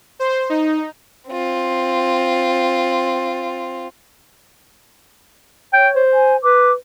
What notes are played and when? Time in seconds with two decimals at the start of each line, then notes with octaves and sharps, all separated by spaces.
0.19 C5
0.50 D#4
1.29 C4 F4
5.73 C#5 G5
5.96 C5
6.14 G#5
6.43 B4 D6